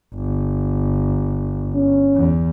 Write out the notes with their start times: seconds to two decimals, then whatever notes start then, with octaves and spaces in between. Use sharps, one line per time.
0.15 G1
1.75 C#4
2.16 E2